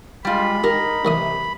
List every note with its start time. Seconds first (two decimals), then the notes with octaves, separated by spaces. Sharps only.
0.25 G3 G#3 F4 B5
0.64 D#4 G4 A#4
1.05 C2 C3 E3 D#6